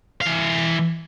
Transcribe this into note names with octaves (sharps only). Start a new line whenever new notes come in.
E3 F5